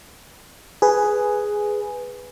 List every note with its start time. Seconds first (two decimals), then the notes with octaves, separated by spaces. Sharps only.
0.82 G#4 B4